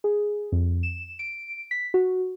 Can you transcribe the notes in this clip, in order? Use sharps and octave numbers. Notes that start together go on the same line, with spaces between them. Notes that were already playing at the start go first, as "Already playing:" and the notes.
G#4
F2
E7
D7
B6
F#4